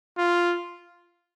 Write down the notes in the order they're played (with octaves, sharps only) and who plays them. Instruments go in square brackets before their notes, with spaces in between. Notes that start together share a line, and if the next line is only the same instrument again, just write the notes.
[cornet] F4